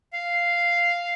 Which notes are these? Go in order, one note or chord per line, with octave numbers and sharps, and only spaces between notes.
F5